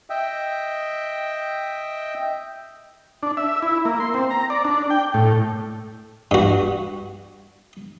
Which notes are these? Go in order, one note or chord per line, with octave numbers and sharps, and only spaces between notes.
D#5 E5 G5
D4
E5
E4
A#3
C6
C4
A#5
D5
D4
G5
A2
G2 F#4